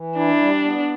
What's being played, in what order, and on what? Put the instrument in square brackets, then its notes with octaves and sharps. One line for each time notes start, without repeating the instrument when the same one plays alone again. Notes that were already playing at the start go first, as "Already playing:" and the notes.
Already playing: [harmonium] E3
[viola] D4 [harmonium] E4
[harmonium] G3
B3